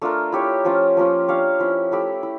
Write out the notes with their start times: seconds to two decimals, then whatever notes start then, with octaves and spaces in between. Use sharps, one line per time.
0.02 A3 D4 F4 A#4
0.32 E4 G4 C#5
0.65 F3 C#4 F4
0.97 F3 A#3 C#4 F4
1.28 D4 G4 C#5 F5
1.60 F3 C#4 E4
1.92 A3 E4 G4
2.23 E4